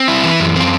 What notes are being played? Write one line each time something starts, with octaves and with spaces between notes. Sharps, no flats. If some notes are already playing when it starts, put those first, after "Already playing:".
Already playing: C4
E4
E3
F#2
C4